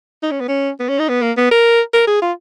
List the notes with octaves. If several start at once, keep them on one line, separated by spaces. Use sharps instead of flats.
D#4
C#4
B3
C#4
B3
C#4
D#4
B3
A#3
B3
A#4
A#4
G#4
F4